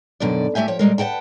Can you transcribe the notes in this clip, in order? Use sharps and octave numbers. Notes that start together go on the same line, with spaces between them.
F#2 B2 D3 D#3 D5
A2 A3 G4 E5 G#5
F3 C#5 G5
A#2 G3 G#3 A#4
B4 D#5 F#5 G5 A5